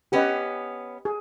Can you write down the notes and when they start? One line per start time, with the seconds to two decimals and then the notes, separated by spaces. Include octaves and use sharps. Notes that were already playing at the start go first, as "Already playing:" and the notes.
0.12 B3 C#4 G4 B4 D#5
1.05 G#4